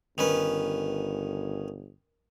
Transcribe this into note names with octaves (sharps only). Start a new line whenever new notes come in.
G1 D#3 C#4 B4